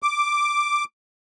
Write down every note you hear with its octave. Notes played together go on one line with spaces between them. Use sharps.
D6